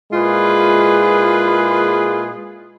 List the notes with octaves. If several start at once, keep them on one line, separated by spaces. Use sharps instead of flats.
A#2 G#3 E4 F4 G#4 B4